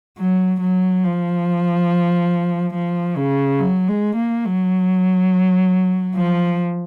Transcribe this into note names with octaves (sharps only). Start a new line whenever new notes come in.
F#3
F#3
F3
F3
C#3
F#3
G#3
A#3
F#3
F3